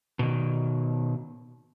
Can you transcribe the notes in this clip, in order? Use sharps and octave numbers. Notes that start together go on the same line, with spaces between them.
B2 D#3